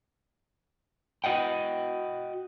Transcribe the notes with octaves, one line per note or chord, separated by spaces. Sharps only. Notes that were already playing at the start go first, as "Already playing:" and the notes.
F#4 D#5 F#5 G5